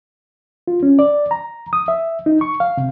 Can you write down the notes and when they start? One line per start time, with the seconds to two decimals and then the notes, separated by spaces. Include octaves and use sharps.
0.67 F4
0.83 C#4
0.99 D5
1.31 A#5
1.73 D#6
1.88 E5
2.26 D#4
2.41 C#6
2.60 F5
2.77 C3